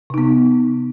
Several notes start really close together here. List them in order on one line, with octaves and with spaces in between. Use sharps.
C3 D#4 B3